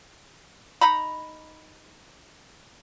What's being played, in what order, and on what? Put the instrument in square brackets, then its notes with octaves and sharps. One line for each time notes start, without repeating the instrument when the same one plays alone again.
[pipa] D#4 A#5 B5